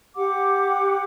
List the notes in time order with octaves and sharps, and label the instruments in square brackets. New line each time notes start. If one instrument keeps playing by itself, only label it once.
[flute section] G4 F#5 D6